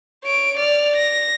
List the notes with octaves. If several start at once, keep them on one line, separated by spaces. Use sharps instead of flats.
C#5 D7
D5 F6
A#6